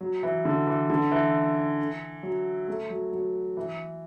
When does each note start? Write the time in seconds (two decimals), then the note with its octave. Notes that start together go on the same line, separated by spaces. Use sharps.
0.01 F#3
0.23 E3
0.45 D3
0.67 E3
0.90 D3
1.11 E3
2.23 F#3
2.68 A3
2.90 F#3
3.13 F#3
3.57 E3